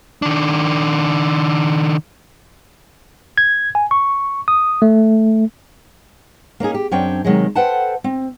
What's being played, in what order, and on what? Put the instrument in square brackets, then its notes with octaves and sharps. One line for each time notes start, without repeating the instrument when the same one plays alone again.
[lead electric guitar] D#3 D4
[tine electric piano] G#6
G#5
C#6
D#6
A3
[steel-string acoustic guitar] A#3 C#4 D#4 G#4
G4
F#2 C4 D4 C#5 G5
C3 D#3 F#3 G#3
A4 B4 C5 F#5 G5 A5
C4